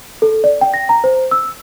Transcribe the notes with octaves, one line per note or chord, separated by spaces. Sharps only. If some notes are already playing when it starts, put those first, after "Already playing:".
A4
D5
G5
A#6
A#5
C5
E6